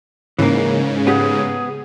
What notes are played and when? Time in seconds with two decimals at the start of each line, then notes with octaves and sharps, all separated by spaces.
0.39 G#2 C#3 E3 A#3
1.07 B3 G4 G#4 F#5